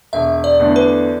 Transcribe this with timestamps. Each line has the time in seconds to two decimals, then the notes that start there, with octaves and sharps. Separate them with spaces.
0.13 E1 E5
0.44 D5
0.59 E2 D3 A3 D4
0.76 B4